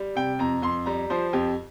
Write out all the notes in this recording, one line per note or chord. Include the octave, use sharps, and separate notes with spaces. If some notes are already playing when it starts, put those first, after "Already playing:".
Already playing: G3
C3 G5
F2 A#5
F2 C6
G3 A#5
F3 C5
F2 G4